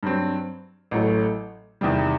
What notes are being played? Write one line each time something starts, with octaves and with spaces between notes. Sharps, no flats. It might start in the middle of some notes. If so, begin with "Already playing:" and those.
G2 F#3 C4
A1 A2 F#3 A3
E2 C3 D#3 G3